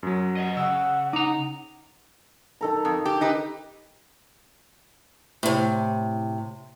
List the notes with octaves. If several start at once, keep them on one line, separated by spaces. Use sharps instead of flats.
F#2 F#3
D#5 F#5
C#3 F#5 E6
D#4 A#5 D6
D#3 A4 A#5
F2
G4
D#4 G4 B4
A2 C3